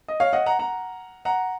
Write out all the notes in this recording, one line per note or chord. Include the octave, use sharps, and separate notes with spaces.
D#5
C#5 F5
D#5 F#5
F#5 A#5
F#5 A#5
F#5 A#5